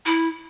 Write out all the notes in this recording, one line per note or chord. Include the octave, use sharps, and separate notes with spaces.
E4